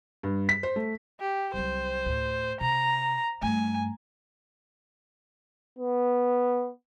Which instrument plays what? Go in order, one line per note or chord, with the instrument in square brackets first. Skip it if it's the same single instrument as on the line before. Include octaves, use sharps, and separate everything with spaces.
[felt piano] G2
B6
C5
A3
[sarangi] G4
[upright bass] C2 F#3 [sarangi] C5
[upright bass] D2 A2
[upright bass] C3 [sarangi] A#5
[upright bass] G2 A3 [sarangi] G#5
[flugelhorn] B3